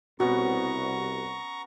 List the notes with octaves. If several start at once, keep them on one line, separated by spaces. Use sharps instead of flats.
C2 B2 B3 C#4 F#4 A#5 C#6